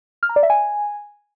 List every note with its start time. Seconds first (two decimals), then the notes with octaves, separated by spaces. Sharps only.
0.23 F6
0.29 A#5
0.36 D5
0.43 E5
0.50 G#5